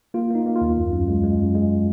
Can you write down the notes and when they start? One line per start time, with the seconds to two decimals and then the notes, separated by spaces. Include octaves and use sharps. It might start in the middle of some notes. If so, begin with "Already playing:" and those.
0.14 A#3 F4
0.30 A#3 D#4
0.46 A#3
0.56 F4
0.61 D#2
0.77 F#2
0.93 F#2
1.08 G#3
1.23 G#3
1.39 F#2
1.55 G#3